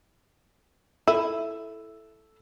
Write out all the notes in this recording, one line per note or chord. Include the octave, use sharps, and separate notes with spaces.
E4 A4 E6 D#7